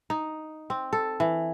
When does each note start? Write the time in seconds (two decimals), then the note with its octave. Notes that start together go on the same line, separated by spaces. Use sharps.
0.10 D#4
0.70 C4
0.93 A4
1.20 E3